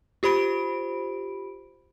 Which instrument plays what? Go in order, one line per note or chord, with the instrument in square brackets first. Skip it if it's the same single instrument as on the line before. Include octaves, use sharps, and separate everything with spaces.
[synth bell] F4 G4 C5 B5 D7